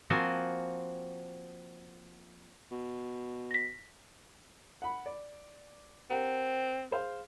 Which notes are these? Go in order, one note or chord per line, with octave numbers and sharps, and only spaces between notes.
F3 A#3 C4 F#4 G#5 A5
B2
A#6 B6
F#5 B5
D5
C4 G4 A#4 F#5
G#4 C5 F5